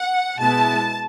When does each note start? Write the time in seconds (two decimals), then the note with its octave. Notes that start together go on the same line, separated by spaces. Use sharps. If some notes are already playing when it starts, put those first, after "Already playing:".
Already playing: F#5
0.38 B2 G#3 B3 E4 A5